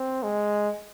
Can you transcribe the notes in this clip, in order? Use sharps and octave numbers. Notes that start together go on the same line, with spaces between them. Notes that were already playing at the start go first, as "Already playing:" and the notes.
Already playing: C4
G#3